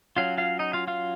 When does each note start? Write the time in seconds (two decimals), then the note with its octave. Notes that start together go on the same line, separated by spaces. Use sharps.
0.16 F#3 C#4 F4 F5
0.38 F4 F5
0.59 D#4 D#5
0.73 F4 F5
0.88 F4 F5